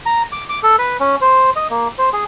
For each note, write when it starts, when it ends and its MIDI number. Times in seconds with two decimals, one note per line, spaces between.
0.06 0.22 82
0.32 0.44 86
0.49 0.59 86
0.63 0.76 69
0.79 0.97 71
1.00 1.16 61
1.21 1.50 72
1.56 1.68 75
1.70 1.88 58
1.98 2.10 72
2.13 2.24 68